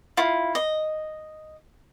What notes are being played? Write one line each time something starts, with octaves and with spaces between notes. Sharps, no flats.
E4 F4
D#5